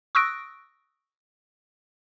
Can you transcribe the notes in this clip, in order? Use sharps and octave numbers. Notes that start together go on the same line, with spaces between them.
C#6 D#6 E6 F#6 A#6 D7